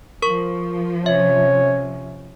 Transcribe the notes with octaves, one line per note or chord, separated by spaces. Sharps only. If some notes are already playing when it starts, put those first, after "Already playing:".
F3 A#4 C#6
C3 C#4 C#5 E5